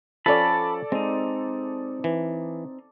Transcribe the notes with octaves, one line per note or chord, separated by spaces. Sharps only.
F3 C#4 A4 D5 A5 B5
G#3 C4 D#4
E3